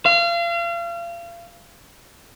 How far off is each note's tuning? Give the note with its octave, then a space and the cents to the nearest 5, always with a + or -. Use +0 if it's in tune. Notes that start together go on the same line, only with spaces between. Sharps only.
F5 -35